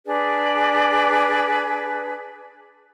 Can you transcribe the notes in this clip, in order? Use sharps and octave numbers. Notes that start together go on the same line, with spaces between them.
D4 G#4 B4 D5